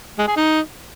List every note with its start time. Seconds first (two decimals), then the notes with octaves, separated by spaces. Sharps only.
0.19 G#3
0.27 G#4
0.36 D#4